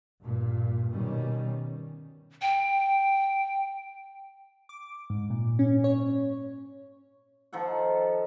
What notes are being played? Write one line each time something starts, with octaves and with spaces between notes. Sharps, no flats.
G2 A#2
B2 D#3 G3 C#4
G5
D6
G#2
A#2
C#4
C#5
D#3 F3 A4 F#5